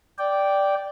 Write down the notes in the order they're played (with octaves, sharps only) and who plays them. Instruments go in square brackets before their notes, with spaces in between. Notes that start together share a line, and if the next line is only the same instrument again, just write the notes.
[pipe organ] D5 G5